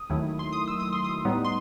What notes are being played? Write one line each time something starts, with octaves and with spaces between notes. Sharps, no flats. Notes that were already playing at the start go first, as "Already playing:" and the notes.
Already playing: D#6
D#2 D#3 F#3 A3 E4
C6
D#6
E6
D#6
C6
D#6
A2 G3 B3 D#4
C6